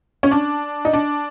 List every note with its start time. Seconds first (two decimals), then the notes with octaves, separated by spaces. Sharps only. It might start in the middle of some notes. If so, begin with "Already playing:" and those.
0.23 C#4
0.31 D4
0.85 D#4
0.93 D4